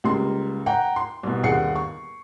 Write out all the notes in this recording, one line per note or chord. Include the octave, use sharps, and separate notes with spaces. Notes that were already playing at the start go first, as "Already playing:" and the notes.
C#2 G3 A#3 C6
F#5 G5 A#5
C6
C2 B2
G1 D#2 G#4 F#5 C7 C#7
C#6